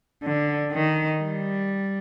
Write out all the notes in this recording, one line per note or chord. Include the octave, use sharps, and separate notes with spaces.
D3
D#3
G3